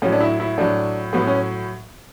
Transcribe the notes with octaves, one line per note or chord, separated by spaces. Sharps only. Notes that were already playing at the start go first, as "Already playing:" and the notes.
A2 F#3 C#4
D4
E4
E4
A2 F#3 D4
A2 F#3 B3
C#4